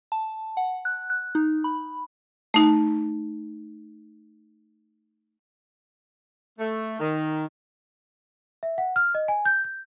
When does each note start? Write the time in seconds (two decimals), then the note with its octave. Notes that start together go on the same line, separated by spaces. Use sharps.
0.12 A5
0.57 F#5
0.85 F#6
1.10 F#6
1.35 D#4
1.64 B5
2.54 A3 D#4
6.59 A3
6.99 D#3
8.63 E5
8.78 F#5
8.96 F6
9.15 D#5
9.28 G#5
9.45 G6
9.65 G6